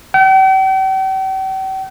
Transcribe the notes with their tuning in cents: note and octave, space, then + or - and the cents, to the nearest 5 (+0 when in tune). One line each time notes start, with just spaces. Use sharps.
G5 -45